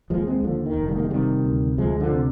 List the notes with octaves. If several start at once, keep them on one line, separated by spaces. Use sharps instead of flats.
D#2 F3 G#3
G#3 C4
D#2 D3 F3
D#3
F1
D#3 G3
A#3
G#3
C3 D#3 G3
D2
D2 F3 G#3
D3 F3
C3